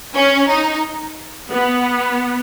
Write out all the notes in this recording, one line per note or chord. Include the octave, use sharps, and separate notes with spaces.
C#4
D#4
B3